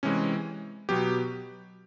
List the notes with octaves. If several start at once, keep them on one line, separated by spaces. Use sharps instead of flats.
C3 E3 G#3 C4 C#4
B2 F#3 B3 G4